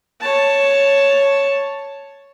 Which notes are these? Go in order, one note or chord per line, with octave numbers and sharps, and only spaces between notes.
C#5 A5